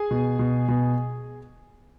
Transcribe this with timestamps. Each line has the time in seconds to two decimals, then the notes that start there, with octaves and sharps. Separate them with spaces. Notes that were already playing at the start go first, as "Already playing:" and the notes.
Already playing: G#4 G#5
0.11 B2
0.39 B2
0.68 B2